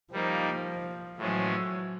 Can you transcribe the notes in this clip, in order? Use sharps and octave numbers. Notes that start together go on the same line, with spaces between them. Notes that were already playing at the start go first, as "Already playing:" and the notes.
F3 G3 A#3 D#4
A2 E3 F#3 G#3 C#4